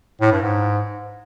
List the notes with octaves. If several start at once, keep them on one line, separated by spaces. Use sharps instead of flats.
A2
G2
G#2